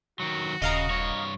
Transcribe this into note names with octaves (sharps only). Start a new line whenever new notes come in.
D#3 F#3 F#4
D#1 C#3 D#5 F5 A#5
G2 C#5